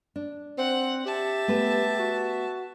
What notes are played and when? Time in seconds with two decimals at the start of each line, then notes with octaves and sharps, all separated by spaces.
0.16 D4
0.58 C4 F#5
1.06 G4 E5 A5
1.48 A3 B3 B4
1.99 F#4